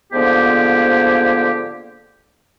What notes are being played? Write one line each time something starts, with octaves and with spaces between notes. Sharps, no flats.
G#2 D3 F3 A#3 B3 G4